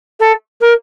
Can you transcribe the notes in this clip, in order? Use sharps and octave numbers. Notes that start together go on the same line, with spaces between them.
A4
A#4